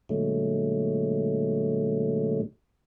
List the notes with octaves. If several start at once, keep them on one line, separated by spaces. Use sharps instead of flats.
A#2 D3 F#3 G#3 A3